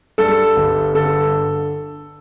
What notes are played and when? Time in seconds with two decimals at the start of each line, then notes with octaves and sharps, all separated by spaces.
0.18 G2 A4
0.56 G1
0.95 D3 A4